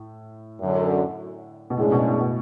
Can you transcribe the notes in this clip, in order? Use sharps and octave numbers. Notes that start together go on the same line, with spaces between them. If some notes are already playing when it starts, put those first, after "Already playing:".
Already playing: A2
F#2 D3 F#3
B2
F#2 A2 C#3 G#3 D4 G#4
B2
A2
B2